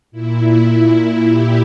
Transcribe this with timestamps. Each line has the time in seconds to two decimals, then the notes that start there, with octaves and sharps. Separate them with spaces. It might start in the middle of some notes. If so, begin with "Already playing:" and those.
0.11 A#2 E4
1.28 G4